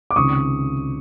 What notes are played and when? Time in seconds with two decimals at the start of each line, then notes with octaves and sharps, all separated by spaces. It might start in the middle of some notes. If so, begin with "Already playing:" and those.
0.11 D6
0.16 C#2 C3 D#3 C#6 D#6